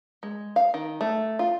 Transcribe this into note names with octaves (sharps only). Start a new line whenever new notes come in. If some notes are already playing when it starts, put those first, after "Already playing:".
G#3
F5
D#3
A3
F4